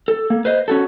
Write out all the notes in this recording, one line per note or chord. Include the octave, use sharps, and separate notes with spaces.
A4
A#3
B4 C5 D#5
C#4 F#4 A4